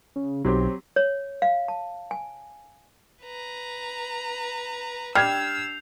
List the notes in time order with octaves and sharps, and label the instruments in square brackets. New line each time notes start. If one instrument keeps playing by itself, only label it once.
[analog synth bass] C#3
[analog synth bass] B1 [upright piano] F#3 C4 G4
[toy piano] C#5
F5
A5
G#5
[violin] B4 A#5
[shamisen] G3 [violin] D4 E6 [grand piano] F6 G#6 [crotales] G6 C7 F7